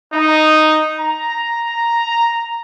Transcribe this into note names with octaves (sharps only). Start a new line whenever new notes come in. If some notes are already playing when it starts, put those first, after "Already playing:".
D#4
A#5